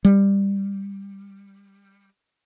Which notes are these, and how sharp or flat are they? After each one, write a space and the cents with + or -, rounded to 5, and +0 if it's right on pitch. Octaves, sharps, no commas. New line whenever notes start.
G3 +15